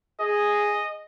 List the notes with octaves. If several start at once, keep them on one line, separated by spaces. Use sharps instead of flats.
G#4 D#5